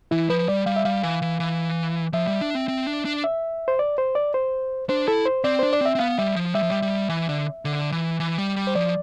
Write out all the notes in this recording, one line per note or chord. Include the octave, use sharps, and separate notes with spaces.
E3 E4
F3 B4
G3 D5
G3 F5
E5
G3 F5
E3
E3
E3
F3 E5
G3
D4
C4
C4
D4
D4
E5
C5
D5
C5
D5
C5
D4 C5
E4 A4
C5
C4 D5
D4 C5
D5
C4 E5
C4
B3 F5
G3 E5
F3
G3 E5
F3
G3
G3
E3
D3
D3
E3
E3
G3
G3
C5
F3 D5